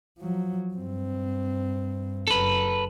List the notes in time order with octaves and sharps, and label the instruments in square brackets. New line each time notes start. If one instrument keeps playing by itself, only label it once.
[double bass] F3 F#3
G2 C4
[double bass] F#1 [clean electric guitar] A4 B4